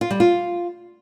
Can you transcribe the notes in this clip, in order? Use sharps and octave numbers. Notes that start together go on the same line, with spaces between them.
F4
G3
F4